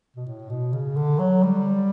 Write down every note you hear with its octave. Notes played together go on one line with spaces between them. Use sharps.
B2
A2
B2
C#3
D3
F#3
G3